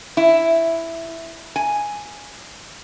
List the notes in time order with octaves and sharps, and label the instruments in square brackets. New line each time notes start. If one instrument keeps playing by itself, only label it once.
[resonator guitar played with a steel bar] E4
G#5